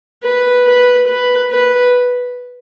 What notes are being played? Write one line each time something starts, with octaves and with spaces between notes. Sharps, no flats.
B4
B4
B4
B4